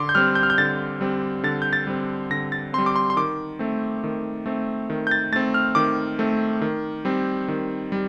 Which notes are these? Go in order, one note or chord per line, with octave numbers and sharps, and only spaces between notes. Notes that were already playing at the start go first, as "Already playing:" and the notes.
Already playing: D3 C6 D6
G6
G3 C4 F6
G6
F6
G6
D3 A6
G3 C4
D3 A6
G6
A6
G3 C4
D3 A#6
A6
G3 C4 C6
D6
C6
C6
D#3 D6
A3 C4
D#3
A3 C4
D#3
G6
A6
A3 C4 A6
F6
D#3 D6
A3 C4
D#3
G3 C4
D#3
G3